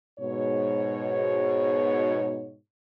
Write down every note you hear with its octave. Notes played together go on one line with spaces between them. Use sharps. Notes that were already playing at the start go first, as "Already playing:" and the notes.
G#2 B2 C#5